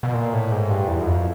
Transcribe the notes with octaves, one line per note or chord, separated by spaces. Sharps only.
B2
A#2
A2
G#2
G2
E2
F#2
F2